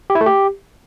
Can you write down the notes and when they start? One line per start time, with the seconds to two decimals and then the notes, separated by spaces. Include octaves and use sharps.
0.10 G4
0.15 E4
0.21 A3
0.26 G4